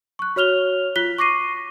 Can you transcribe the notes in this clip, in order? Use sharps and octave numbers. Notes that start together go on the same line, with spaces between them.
C#6 F#6
F#4 C#5 F6 F7 G7
F4 F#6 B6 G7
C#6 D6 A#6 C7 D#7